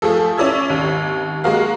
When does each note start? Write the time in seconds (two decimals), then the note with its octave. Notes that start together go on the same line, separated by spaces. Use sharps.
0.02 F3 A3 F4 G#4 A4
0.38 C#4 E4 D5 E6 G#6
0.69 G#1 D#2
1.44 G#3 A#3 F#4 A#4 F5